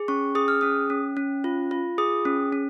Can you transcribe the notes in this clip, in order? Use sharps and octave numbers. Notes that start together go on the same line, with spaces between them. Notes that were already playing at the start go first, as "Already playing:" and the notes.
Already playing: G#4
C#4 C#6
G#4 D#6
F6
C#4 D#6
C#4
C#4
F4
F4
G#4 D#6
C#4
C#4